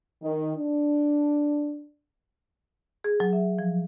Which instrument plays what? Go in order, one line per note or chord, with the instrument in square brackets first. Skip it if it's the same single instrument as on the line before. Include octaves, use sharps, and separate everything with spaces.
[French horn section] D#3
D4
[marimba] G#4
F#3
E5
F3